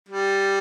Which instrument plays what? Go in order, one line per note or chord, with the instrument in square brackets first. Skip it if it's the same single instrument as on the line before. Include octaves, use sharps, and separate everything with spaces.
[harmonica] G3